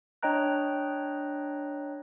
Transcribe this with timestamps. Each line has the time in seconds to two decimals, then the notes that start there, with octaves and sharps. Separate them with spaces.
0.23 D4 C#5 D#5 G5 A#5 F#6